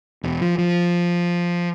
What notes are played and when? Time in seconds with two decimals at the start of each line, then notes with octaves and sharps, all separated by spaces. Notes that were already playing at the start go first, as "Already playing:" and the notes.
0.23 E1
0.41 F3
0.58 F3